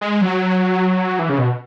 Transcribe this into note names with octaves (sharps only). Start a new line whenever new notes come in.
G#3
F#3
E3
C#3
B2